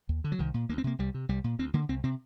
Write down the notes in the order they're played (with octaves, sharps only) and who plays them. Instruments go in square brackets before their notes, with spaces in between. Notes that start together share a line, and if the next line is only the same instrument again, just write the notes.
[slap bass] D#2
D3
F#3
C2 D#3
A#2
D2 A#3
C4
C3 A#3
C2 G3
C3
C2 G3
A#2
D2 C4
D3 A#3
C2 C4
C3 C4